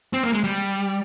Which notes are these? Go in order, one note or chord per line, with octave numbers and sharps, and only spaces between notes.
C4
A#3
G#3
G3